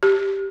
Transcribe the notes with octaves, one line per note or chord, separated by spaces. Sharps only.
G4